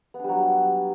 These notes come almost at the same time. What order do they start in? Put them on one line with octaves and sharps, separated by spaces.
B3 D4 G3 F#3